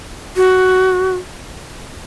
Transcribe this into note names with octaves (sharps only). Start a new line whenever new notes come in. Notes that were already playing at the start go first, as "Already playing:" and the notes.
F#4